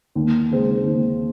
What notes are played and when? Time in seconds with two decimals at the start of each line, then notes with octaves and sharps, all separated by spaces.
0.15 D#2
0.50 C#3 G#3 C4
0.86 D#2